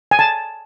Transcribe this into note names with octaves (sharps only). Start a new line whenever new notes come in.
G#5
A5